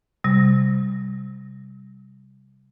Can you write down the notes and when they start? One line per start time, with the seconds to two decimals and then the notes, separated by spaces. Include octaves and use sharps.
0.24 C3 G3